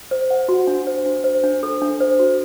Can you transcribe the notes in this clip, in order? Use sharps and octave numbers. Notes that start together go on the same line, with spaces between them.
C5
F#5
F#4
D4
C5
D4
C5
D4
A4
D4
C5
F#4